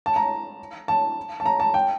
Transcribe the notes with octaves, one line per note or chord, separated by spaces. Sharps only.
A5
A#5
A5
A5
A#5
A5
G5